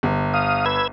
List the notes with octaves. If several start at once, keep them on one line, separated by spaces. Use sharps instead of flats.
G1
F5 D#6
B4 E6 G#6